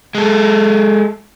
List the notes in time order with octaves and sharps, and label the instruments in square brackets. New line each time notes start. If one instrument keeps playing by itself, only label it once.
[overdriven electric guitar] G#3 A4